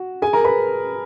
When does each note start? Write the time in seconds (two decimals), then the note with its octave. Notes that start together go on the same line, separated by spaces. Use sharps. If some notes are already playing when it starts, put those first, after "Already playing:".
Already playing: F#4
0.22 G#4 G#5
0.33 A#4 A#5
0.44 B4 B5